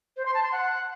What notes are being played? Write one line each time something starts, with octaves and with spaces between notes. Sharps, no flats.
C5
C6
A5
C6
F#5